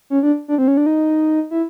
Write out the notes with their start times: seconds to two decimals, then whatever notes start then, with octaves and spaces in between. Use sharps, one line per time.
0.10 C#4
0.23 D4
0.48 D4
0.58 C4
0.68 C#4
0.77 D4
0.86 D#4
1.51 E4